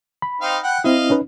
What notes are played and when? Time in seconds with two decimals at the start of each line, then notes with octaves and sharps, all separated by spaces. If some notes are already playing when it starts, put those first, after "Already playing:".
0.22 B5
0.41 C4 D#4 F5
0.63 F#5 G5
0.84 C4 E4 D#5 F5
1.10 C#4 D#4 B4